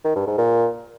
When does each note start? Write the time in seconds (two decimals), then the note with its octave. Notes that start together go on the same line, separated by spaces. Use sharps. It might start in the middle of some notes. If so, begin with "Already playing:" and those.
0.05 D#3
0.16 G2
0.27 G#2
0.38 A#2